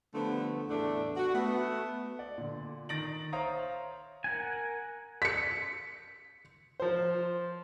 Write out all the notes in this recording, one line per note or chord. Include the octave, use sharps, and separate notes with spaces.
D3 F3 G3 A3 B3
E2 A2 E3 A3 D4
F#4
A3 B3
D5
A#2 D3
D#3 A6 A#6 D7 F#7
C5 C#5 E5 F5 A#5 D#6
A#4 F#5 G#5
B6 C#7
F3 C5